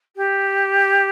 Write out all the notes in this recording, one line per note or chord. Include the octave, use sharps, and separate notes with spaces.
G4